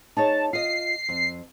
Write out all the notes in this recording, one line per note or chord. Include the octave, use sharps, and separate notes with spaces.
D#4 G#4 C#5 A5
F4 D#5 C7
F2